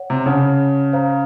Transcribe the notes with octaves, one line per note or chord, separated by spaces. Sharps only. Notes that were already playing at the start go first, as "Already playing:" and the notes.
Already playing: C#5 F#5
C3
C#3 C#5 F#5 A5
C5 F5 A#5